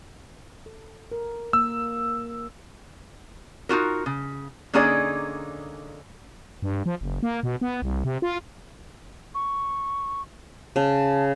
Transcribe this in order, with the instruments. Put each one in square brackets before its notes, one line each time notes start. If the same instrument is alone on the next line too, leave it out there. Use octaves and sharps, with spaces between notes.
[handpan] A4
A#4
[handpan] A#3 [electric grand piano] E6
[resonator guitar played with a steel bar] D#4 F4 F#4 A#4
C#3
D3 A#3 C#4 D#4 G#4 D5
[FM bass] G2
F3
F#1
A#3
B2
B3
C2
C3
F4
[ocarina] C#6
[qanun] C#3 [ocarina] A5